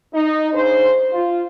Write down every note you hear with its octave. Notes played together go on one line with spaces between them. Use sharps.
D#4
C#3 D4 D#4 C5
F4